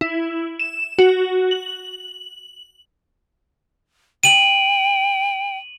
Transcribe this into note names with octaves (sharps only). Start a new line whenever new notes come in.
E4
E7
F#4
F#7
G5 D#7 F#7